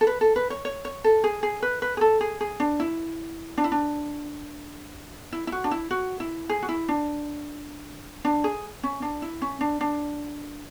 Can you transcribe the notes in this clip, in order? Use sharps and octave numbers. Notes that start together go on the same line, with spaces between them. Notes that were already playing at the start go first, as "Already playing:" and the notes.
A4
B4
A4
B4
C#5
C#5
C#5
A4
G#4
G#4
B4
B4
G#4
A4
G#4
G#4
D4
E4
D4
E4
D4
E4
E4
F#4
D4
E4
F#4
E4
G#4
F#4
E4
D4
D4
G#4
C#4
D4
E4
C#4
D4
D4